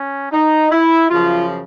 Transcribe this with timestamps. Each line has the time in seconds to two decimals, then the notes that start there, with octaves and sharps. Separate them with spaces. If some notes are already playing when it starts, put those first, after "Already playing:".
Already playing: C#4
0.32 D#4
0.71 E4
1.09 F#2 C#3 F3 F4